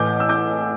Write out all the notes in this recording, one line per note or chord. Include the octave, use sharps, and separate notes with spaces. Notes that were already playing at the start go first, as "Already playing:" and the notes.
Already playing: A1 A2 E3 D6 G6
E6
D6 G6